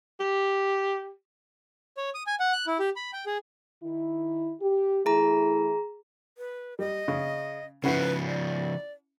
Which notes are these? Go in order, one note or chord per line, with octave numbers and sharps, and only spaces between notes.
G4
C#5
D#6
G#5
F#5
F#6
E4
G4
B5
G5
G#4
D#3 E4
G4
E3 A3 E4 G#4 A#5
B4
G3 D#5
C#3
C#3 F3 C#4 E4 B4 F#5
D5